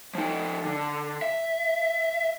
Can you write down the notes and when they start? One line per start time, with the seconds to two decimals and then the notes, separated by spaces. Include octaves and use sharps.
0.15 F3 D#4
0.65 D3
1.22 E5